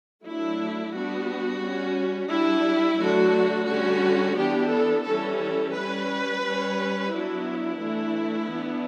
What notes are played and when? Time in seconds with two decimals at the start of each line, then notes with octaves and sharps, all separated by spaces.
0.24 F#3 A3 D4 E4
0.93 G3 B3 D4 F#4
1.62 G3 C#4
2.30 G3 D4 E4
2.99 D3 F#3 A3 D4 F#4
3.68 D3 G3 C#4 F#4
4.36 E3 B3 D4 G4
4.71 A4
5.05 E3 G3 C#4 A4
5.40 A4
5.74 G3 C#4 B4
6.42 G3 C#4
7.11 F#3 B3 D4 E4
7.79 E3 A3 D4
8.49 E3 B3 D4